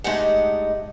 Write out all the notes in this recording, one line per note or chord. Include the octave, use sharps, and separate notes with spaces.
G#3 A3 D4 D#4 G4 F#5